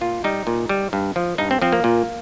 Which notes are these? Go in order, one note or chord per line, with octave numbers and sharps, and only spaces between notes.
A#2 F4
G3 D#4
A#2
G3
G2
F3
G2 D#4
C4
F3 C4
A#3
A#2